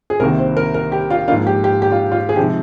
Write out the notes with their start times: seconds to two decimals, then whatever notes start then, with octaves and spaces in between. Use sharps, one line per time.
0.10 G#4
0.20 C2 C3 D#3 A#3 A#4
0.38 C5
0.57 A#4
0.74 A#4
0.92 G4
1.10 F4
1.28 G#2 F3 A#3 D#4 F4
1.47 G4
1.64 G4
1.82 G4
1.92 F4
2.12 F4
2.29 G#4
2.36 C3 F3 G#3 D#4 G4